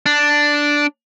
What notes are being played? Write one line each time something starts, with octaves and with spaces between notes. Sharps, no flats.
D4